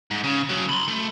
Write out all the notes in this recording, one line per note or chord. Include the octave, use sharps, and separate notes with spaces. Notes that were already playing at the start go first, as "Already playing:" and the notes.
G#2
C#3
C#3 F#3
B5 C6
A3